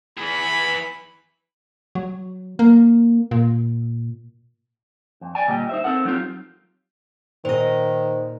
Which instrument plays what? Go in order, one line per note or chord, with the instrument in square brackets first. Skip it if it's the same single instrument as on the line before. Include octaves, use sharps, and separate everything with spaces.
[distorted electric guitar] E3 G#4 [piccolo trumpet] B5
[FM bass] F#3
A#3
A#2
[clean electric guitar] F2
D5 G5 G#5
D2 A#2 G3 D#5 G5
D#4 C5 E5
C4 A4 A#4 F#5
F#3 C4 D#4 F4 G4
[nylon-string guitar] A#2 D#5 [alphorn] D#3 [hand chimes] C5